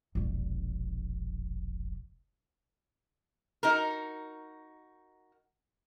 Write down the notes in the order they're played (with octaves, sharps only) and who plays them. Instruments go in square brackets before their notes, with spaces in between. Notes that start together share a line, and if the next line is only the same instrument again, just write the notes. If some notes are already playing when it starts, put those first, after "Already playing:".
[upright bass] E1 A#1
[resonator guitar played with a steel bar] D#4 F#4 A#4